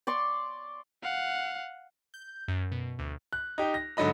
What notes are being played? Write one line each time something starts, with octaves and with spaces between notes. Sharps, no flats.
D5 C6 C#6
F5 F#5
G6
F#2
B2
D2
F#6
D#4 G4
A#6
G#2 D3 F#3 D#5 B5